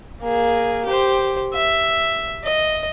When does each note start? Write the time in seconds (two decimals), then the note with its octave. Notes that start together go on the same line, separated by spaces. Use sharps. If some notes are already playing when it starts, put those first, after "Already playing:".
0.21 A#3 G#4
0.86 G4 C5
1.54 E5
2.45 D#5